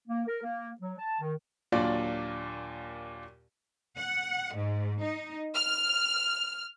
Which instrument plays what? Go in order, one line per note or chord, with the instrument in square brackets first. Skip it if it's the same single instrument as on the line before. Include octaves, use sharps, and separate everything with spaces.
[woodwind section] A#3
A#4
A#3
F#3
A5
D#3
[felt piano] D#2 A#2 F#3 D4 F4 D5
[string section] F#5
G#2
D#4
F6